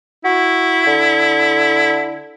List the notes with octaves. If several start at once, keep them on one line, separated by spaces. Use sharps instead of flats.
E4 F#4
D3